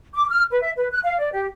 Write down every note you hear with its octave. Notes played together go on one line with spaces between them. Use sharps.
D6
F6
B4
E5
B4
F#6
F5
D5
G4